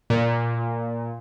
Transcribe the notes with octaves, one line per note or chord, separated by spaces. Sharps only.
A#2